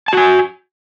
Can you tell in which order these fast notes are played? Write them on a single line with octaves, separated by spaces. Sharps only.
A5 F#4 G#5